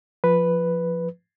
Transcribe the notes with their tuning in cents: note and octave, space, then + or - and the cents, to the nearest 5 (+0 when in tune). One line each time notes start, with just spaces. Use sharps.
F3 +0 B4 +0